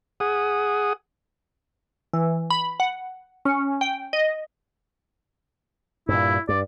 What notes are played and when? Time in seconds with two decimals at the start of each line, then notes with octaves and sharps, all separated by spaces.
0.20 G#4 F#5 D#6
2.13 E3
2.50 B5
2.80 F#5
3.45 C#4
3.81 G5
4.13 D#5
6.09 G2 A#2 E4
6.49 G2 D5